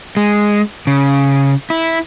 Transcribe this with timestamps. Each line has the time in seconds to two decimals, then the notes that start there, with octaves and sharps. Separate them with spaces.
0.17 G#3
0.87 C#3
1.70 E4